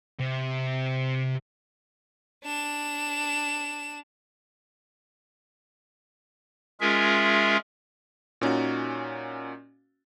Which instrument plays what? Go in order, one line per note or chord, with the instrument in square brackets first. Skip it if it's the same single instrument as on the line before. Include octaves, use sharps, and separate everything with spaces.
[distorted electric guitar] C3
[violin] D4 E7
[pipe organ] G#3 C#4 F4 G#4 A#4 E5
[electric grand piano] A#2 C#4 D#4 F#4